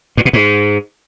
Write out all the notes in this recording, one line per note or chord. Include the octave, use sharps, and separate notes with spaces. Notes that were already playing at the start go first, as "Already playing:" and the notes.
G2
B2
G#2